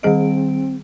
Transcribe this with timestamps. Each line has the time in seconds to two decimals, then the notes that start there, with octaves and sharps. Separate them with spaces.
0.03 D#3 G3 C4 G#4 D#5 D7